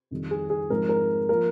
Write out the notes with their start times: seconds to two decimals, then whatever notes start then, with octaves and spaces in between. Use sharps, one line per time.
0.11 F2 D#3 G3
0.31 G#4
0.50 G#4
0.70 G#2 F3 G#3 C4 A#4
0.89 A#4
1.29 F3 A#3 A#4